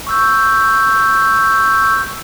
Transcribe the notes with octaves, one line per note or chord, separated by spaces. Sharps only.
C#6 E6 G6